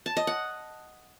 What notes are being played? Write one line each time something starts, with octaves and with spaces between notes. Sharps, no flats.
A5
D#5
F#5